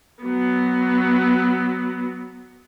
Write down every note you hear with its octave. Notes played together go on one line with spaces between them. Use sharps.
F#3 B3